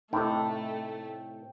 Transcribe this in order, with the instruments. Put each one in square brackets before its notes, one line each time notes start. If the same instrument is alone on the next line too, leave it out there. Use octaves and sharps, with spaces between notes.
[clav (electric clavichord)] A2 C3 [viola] A3 [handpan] D#4 A4 [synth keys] G5